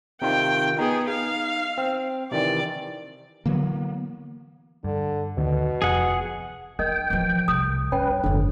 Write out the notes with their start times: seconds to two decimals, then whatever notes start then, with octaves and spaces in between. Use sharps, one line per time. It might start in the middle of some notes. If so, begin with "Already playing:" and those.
0.22 C3 D#3 F4 G5
0.78 B3 D#4 G#4
1.10 F5
1.78 C4
2.32 C3 D#3 E3 D5
3.46 D3 E3 F#3 A#3 B3
4.84 G2 D3
5.38 D2 B2 D3 D#3
5.82 F1 F2 F3 G#4 F#5
6.79 D4 A#4 D#5 G5
7.10 E3 F3
7.48 C2 D#6
7.92 G2 C#4 B4 G5
8.24 F#1 G#2 D3